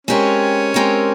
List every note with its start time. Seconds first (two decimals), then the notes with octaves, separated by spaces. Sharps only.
0.07 G#3 C4 C#4 G4 A#4 C#5
0.74 G#3 C4 G4 A#4 C#5